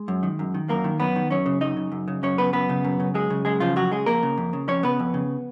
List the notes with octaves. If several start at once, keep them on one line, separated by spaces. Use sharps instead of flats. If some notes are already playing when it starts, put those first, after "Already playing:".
Already playing: G#3
F#2
D#3
F#2
D#3
F#2 A#3 A#4
D#3
F#2 B3 B4
D#3
F#2 C#4 C#5
C#3
F#2 D#4 D#5
C#3
F#2
C#3
F#2 C#4 C#5
C#3 B3 B4
F#2 B3 B4
C#3
F#2
C#3
F#2 G#3 G#4
C#3
F#2 G#3 G#4
C#3 F3 F4
F2 F#3 F#4
C#3 G#3 G#4
F2 A#3 A#4
C#3
F2
C#3
F2 C#4 C#5
C#3 B3 B4
F2
C#3